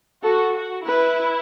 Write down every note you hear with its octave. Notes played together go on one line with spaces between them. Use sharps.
F#4 A4
F#4
E4 B4